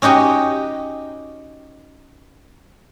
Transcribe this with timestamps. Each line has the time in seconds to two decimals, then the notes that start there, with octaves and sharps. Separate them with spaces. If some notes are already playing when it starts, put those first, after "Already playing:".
0.02 C#4 D#4 F#4 G4 D#5